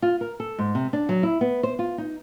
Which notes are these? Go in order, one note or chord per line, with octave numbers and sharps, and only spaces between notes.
F4
A#4
A4
G#2
C3
D4
F#3
E4
B3
C5
F4
D#4